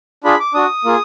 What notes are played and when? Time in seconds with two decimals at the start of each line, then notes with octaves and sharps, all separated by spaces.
0.24 D4 F4 G#4 B5
0.40 D6
0.54 D4 F#4 D#6
0.85 A#3 F4 G#4